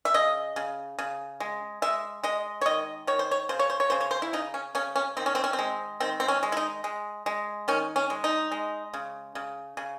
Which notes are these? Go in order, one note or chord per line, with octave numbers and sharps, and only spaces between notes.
E5
C#3 D#5
C#3
C#3
G#3
G#3 E5
G#3 D#5
C#5
D#3 D#5
D#3 C#5
C5
C#5
C#3 C5
C#5
C5
C#5
C#3 C5
C#5
C5
E4
C#3 D#4
C#4
C#3 C#4
C#4
D#3 C4
C#4
C4
C#4
C4
G#3
D#3 C4
C4
C#4
G#3
E4
D#4
G#3
G#3
D#3 C#4
C#4
G#3
D#4
G#3
C#3
C#3
C#3